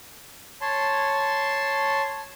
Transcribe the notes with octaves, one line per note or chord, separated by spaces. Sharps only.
C#5 A5 C6